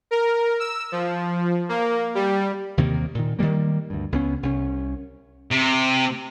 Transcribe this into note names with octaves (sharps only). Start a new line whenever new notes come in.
A#4
E6
F3
A#3
G3
D#2 C3 D#3 A#3
A#2 D#3
D#3 F#3 G3 A#3
D2 G2
C#2 B3 C#4
C2 C#4
C3